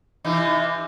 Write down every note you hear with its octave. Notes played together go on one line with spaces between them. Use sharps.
C3 E3 D#4